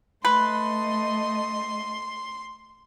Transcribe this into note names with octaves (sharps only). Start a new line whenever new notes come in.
A3 B4 D#5 C6